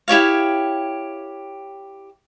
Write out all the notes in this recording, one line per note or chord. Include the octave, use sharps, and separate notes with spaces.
E4 G4 C#5 F5